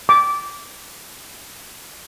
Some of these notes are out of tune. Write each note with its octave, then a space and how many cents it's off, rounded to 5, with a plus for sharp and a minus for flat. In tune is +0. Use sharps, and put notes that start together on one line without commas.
D6 -10